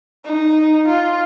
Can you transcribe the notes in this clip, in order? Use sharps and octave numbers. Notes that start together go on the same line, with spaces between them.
D#4
F4